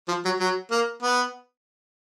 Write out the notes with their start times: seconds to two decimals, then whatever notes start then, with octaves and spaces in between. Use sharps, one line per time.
0.09 F3
0.25 F#3
0.40 F#3
0.71 A#3
1.02 B3